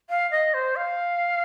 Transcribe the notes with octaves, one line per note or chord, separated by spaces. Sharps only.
F5
D#5
C5
F5